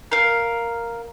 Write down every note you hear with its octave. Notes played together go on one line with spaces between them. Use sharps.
A#4 F5